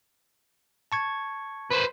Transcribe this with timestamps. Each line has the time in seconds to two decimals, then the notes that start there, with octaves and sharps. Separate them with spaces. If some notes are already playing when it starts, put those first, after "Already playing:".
0.92 A5 C#6 G#6
1.70 B4 C5